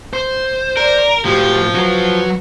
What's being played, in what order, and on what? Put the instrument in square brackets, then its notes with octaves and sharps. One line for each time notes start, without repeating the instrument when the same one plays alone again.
[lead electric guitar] C5
[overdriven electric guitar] A#4 [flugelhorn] D5
[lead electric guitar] A2 F#4 [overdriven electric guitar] F3 [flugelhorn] G4
[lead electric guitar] F#3 F#4 [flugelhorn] B4